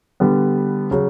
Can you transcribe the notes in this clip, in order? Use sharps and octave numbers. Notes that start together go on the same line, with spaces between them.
D3 G3 B3
C#3 F#3